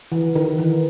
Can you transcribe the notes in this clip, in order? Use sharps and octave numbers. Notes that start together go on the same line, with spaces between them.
E3
D#3
E3